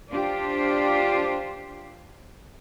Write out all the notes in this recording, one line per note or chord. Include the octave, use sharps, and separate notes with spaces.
D4 F4 G4 C5